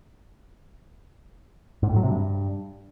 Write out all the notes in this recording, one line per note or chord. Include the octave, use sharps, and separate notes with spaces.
G#2
A2
F#3
C3
G2